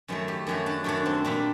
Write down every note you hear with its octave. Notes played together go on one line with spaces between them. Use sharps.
F#2 D#3 F#3 A3
G4
F#2 D#3 F#3 A3
D4
F#2 D#3 F#3 A3 D4
C4
A#2 G3 A#3 D4